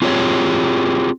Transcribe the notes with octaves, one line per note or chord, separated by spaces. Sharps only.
C4 F4 G4 G#4 C#5